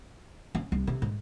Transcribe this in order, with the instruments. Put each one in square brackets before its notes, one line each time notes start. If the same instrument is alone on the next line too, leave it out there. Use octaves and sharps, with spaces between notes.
[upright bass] C#4
C2
C3
G#2